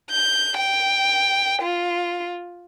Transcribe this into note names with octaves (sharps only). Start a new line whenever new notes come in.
G6
G5
F4